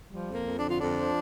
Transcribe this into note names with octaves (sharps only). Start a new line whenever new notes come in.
F3 G3
F2
A#3
F2
D3 D4
F4
F2 D4
F3